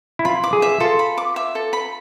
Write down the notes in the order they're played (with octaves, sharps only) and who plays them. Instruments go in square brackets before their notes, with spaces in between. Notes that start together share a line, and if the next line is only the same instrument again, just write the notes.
[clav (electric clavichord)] E4
[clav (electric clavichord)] F4 [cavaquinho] B5
[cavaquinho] D6
[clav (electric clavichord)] G#4
[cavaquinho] E5
[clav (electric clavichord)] F4 [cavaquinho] A4
[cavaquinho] B5
D6
E5
A4
B5